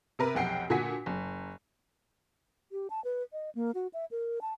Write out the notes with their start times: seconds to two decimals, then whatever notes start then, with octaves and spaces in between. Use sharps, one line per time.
0.19 C3 A#4 B4
0.35 F1 B1 F#5 G5 C7
0.70 A#2 D3 F#4 F#5 G#5 B6
1.06 F#1
2.72 G4
2.90 A5
3.04 B4
3.33 D#5
3.55 A#3
3.75 F#4
3.94 E5
4.11 A#4
4.41 A5